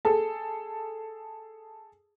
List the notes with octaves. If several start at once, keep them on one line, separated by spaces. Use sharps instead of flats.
G#4 A4 A5